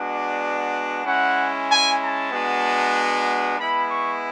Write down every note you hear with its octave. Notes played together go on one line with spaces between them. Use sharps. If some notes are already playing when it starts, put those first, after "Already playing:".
Already playing: G#3 B3 D4 F#4
D5
G#3 C#4 E4 F#5
G#5
A5
G#3 B3 D4 F#4
G#3 B3 E4 B5
C#6